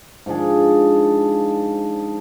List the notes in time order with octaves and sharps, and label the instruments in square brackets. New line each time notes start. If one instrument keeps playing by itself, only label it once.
[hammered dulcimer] G#2 F3 D4 G#4